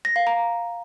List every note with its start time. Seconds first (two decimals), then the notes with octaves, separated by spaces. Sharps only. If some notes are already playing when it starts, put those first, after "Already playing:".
0.05 A#6
0.16 F5
0.27 A#5